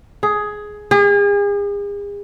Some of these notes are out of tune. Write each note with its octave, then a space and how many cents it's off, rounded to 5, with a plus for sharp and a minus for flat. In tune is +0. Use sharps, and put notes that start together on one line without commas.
G#4 +10
G#4 -40